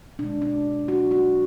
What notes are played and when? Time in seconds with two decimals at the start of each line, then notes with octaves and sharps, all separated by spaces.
0.19 B2 G#3 D4
0.42 D4
0.88 F#4
1.11 F#4